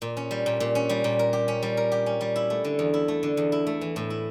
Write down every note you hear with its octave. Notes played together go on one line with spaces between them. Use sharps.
A#2
C#4
G3
A#2
A#2
C#4
G3
A#2
A#4
G4
C#4
G3
A#4
G4
C#4
G3
E4
A3
D3
E2
E4
A3
D3
E2
E4
A3
E3
A2
E4